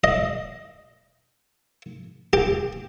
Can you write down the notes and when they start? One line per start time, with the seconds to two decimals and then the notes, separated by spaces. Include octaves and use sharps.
0.04 D#5
2.33 G4